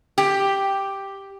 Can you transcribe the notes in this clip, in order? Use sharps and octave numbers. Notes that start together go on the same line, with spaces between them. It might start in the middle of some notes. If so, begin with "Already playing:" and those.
G4